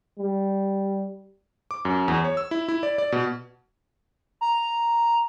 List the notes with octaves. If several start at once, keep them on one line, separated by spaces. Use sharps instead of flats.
G3
D6
F#2
E2
C#5
E6
E4
E4
D5
D5
B2
A#5